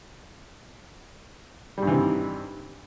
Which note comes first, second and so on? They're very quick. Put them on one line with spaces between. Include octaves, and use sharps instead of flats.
G3 G2 E3 C3 D#3